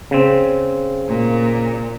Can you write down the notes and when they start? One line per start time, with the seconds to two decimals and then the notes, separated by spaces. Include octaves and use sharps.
0.11 C#3 C4
1.08 A#2